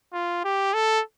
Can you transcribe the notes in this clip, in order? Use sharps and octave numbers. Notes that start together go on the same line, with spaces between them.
F4
G4
A4